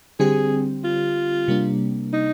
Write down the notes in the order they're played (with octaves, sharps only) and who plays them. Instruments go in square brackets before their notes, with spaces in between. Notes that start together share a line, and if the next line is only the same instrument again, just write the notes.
[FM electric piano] D3 G3 C4 G4 [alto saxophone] G#4
[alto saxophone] F4
[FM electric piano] C3 G3 A#3 D4
[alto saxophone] D#4